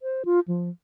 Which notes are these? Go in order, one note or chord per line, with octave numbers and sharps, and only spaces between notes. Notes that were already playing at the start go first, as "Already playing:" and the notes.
C5
F4
F3